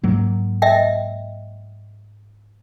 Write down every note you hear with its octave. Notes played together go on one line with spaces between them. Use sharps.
G#2 F#3 A#3
D#5 E5 G5